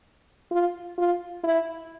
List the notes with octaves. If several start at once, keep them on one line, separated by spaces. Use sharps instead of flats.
F4
F4
E4